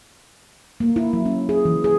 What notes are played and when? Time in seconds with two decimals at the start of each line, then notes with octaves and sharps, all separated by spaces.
0.80 A#3
0.96 E4
1.13 F#3
1.26 C#4
1.49 G#4
1.65 E3
1.84 G#4